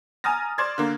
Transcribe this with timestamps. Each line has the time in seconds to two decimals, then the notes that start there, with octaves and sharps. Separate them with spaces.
0.24 G#5 A#5 D#6 F6 A6 A#6
0.58 C5 D5 C6 G#6 A6
0.78 D3 A#3